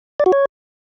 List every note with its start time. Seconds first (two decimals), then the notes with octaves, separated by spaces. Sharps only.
0.20 D5
0.26 F#4
0.32 C#5